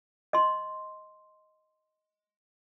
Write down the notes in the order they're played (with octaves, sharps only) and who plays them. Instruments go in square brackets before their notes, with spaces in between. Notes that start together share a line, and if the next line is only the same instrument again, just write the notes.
[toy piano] D#5 C6